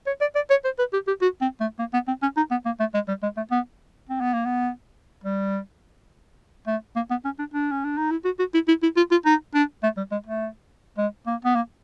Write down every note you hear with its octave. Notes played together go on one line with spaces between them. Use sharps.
C#5
D5
D5
C#5
C5
B4
G4
G4
F#4
C4
A3
A#3
B3
C4
C#4
D#4
B3
A#3
A3
G#3
G3
G#3
A3
B3
C4
B3
A#3
B3
G3
A3
A#3
B3
C#4
D4
D4
C#4
D4
D#4
E4
F#4
F#4
E4
E4
E4
F4
F4
D#4
D4
A3
G3
G#3
A3
G#3
A#3
B3
A#3